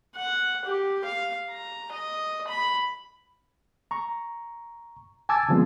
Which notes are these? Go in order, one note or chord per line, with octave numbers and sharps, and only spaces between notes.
F#5
G4
F5
A#5
D#5
B5
A#5 C#6
G#5 A5 D6 E6 G#6 A6
D3 E3 F3 G#3 B3 C4